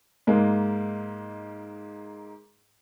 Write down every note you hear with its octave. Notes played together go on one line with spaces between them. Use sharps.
G#2 G#3 A#3